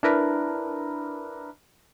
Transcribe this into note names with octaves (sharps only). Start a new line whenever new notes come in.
D4 E4 A#4 B4